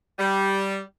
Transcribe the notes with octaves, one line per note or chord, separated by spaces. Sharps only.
G3